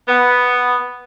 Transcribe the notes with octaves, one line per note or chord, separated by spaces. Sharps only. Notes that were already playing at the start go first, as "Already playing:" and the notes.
B3